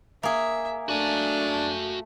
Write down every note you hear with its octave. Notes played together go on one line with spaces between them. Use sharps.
A#3 G#4 E5
A3 D4 F#4 G#5